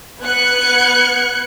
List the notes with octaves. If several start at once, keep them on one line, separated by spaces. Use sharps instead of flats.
B3 F#6 G#6 C#7